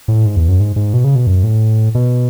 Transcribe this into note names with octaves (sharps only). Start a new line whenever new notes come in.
A2
G#2
E2
F#2
G#2
G#2
B2
C#3
B2
F#2
A2
B2